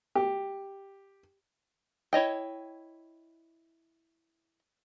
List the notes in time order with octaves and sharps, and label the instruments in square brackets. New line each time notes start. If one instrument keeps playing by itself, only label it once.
[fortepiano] G4
[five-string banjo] E4 C#5 D#5 G5